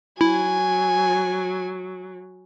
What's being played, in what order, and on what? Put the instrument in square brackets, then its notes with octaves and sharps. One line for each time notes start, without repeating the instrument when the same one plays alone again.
[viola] F#3 [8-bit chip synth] E4 [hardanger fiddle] G#5